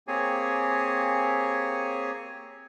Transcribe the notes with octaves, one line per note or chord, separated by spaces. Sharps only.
A#3 C4 G4 G#4 C#5 G#5